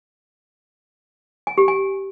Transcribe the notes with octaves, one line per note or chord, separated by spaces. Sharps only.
G#5
G4
G#5